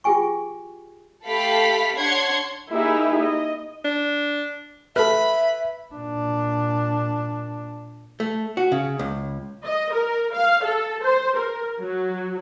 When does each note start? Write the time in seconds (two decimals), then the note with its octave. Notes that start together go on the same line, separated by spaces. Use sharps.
0.04 F4 G4 G#4 G5 G#5 C#6
1.27 A3 G4 A4 F5 B5 B6
1.97 D4 C#5 F#5 C6 G#6
2.71 A#3 D#4 E4 G4 G#4
3.20 D#5
3.85 D4
4.96 A4 B4 E5 B5 F6
5.94 A#2 D4
8.20 A3
8.57 F#4
8.72 C#3
8.99 C#2
9.65 D#5
9.93 A#4
10.33 F5
10.63 A4
11.04 C5
11.36 A#4
11.80 F#3